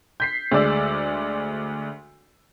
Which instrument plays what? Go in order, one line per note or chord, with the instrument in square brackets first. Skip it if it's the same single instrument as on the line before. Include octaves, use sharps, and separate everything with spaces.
[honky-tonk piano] G6 B6 C7
D2 G#3 D5 E6